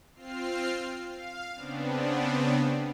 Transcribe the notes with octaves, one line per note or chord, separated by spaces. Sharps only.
C4 F4 F6 C7
F5
C#3 B3 C4 D4